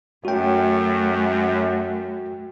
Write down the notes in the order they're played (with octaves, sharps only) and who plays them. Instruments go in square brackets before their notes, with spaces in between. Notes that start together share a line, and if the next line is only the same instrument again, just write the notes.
[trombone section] F#2 [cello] A3 [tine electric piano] F#4 G5